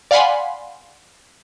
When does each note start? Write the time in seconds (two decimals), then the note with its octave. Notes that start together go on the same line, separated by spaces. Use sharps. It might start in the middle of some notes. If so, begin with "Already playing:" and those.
0.11 D5 F5 F#5 G#5 B5 C6